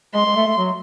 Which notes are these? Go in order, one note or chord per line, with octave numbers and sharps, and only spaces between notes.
G#3 C6
G#3
A3
A3
F#3